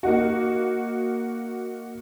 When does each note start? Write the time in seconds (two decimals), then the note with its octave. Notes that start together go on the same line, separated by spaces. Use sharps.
0.03 A#3 D#4 F#4